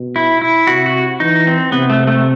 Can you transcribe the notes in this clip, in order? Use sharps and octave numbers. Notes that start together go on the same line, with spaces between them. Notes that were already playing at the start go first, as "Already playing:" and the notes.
Already playing: B2
E4
E4
C3 F#4
F#4
E3 D#4
C4
C3 B3
A3
A3